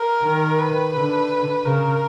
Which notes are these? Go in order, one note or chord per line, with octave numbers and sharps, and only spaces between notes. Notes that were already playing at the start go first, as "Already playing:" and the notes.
Already playing: A#4
D#3
B4
D3
C#3 A#4